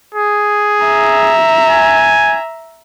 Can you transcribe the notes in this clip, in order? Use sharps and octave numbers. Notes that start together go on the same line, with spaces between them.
G#4
E5 A#5
G#5